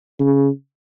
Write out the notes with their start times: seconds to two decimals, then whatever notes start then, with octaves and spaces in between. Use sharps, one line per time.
0.20 C#3